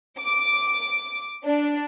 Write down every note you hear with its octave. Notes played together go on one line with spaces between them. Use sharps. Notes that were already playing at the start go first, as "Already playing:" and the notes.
D6
D4